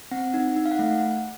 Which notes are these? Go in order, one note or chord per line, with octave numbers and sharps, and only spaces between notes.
C4 F#5
D#4
D#4
F5
F#5
A3